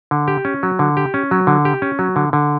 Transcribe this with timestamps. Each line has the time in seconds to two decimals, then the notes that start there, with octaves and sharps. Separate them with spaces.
0.11 D3
0.28 G4
0.45 C#4
0.63 F#3
0.79 D3
0.97 G4
1.14 C#4
1.31 F#3
1.47 D3
1.65 G4
1.82 C#4
1.99 F#3
2.16 D3
2.33 D3